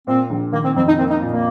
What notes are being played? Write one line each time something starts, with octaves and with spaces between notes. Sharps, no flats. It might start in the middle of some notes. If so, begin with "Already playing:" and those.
A#2 C4
A#1
D#3 A#3
C4
F2 C4
D#4
A#3 C4
D#4
A#2
A#3